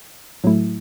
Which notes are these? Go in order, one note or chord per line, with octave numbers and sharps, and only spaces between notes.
A2 F#3 A3 E4